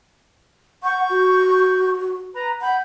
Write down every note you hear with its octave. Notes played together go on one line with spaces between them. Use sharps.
F#5 C#6 G6
F#4
B4 A#5
F#5 B5 G6